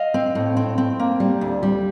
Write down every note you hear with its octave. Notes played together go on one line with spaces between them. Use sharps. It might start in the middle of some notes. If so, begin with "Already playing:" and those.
Already playing: D#5 F5
C4
A2
C4
C4
A#3
G3
D2
G3